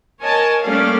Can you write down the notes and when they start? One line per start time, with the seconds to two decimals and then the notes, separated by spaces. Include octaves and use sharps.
0.20 A#4 C#5 D#5 G#5 A5
0.64 G3 A3 A#3 C#4 D5 F5